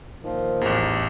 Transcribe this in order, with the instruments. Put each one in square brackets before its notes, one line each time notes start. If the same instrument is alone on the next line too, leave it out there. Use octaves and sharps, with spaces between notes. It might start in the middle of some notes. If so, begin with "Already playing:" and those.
[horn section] A#2 D#3 F3
[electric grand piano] A1 E2